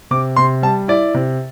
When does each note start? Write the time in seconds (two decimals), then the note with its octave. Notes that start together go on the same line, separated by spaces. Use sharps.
0.11 C3 D6
0.36 C3 C6
0.62 G3 A5
0.88 E4 D5
1.14 C3